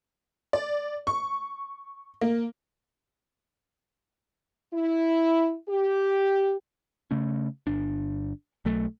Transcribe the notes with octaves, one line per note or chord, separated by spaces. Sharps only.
D5
C#6
A#3
E4
G4
C#3 A3 C#4
G1 D4
B1 F#3 A3